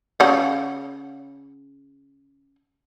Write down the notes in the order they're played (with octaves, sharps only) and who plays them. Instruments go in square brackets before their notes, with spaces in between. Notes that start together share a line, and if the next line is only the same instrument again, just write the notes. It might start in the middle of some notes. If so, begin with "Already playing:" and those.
[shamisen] C#3 F#5